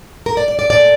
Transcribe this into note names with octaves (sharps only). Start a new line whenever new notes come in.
A#4
D5
D5
D5
A#2 A3 D5